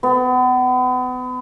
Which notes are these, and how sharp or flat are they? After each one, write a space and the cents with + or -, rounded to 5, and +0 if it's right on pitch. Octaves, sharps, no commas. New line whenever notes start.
B3 +35